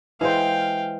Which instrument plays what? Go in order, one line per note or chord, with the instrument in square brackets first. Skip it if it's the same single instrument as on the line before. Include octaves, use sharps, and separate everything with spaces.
[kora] E3 G#3 C5 [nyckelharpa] F5 G5